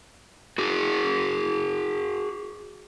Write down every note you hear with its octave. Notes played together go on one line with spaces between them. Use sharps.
F#4 G#4